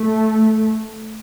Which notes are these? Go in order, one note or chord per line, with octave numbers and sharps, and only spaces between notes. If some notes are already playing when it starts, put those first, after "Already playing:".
Already playing: A3